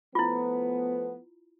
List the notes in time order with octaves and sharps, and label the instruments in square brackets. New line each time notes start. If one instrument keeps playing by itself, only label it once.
[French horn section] F3 A3 B3 [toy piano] E4 F4